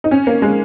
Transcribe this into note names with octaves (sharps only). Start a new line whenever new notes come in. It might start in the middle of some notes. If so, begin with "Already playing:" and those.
D#4
C#4
A#3
G#3